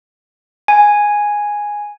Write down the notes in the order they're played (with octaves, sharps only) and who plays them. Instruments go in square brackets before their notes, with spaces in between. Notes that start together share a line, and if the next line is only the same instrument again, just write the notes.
[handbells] G#5